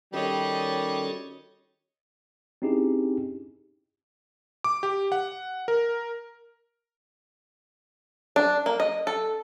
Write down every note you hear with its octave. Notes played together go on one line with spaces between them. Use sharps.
D#3 G3 C#4 F#4 A4 C#5 D#5
C4 C#4 D#4 E4 G4 G#4
D6
G4
F#5
A#4
D4
A#3
D#5
A4